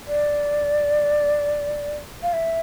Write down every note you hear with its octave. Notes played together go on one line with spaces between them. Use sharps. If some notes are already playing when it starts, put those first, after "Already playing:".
D5
F5
E5